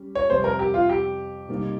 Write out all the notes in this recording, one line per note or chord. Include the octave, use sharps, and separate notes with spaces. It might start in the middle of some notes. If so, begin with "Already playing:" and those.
Already playing: G3 C#4
C#5
F2 C3 G3 C4 C5
A#4
G4
F4
G4
C3 G3 A#3 D#4